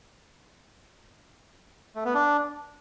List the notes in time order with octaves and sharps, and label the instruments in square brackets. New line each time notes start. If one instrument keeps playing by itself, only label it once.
[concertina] A3
B3
D4